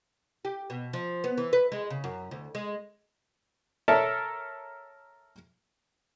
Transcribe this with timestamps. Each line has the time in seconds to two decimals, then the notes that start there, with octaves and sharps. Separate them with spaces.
0.45 G4
0.70 B2
0.93 F3
1.24 B3
1.38 E3
1.53 B4
1.72 G#3
1.90 C#3
2.04 F#2
2.31 D2
2.55 G#3
3.88 A4 A#4 C#5 E5 A5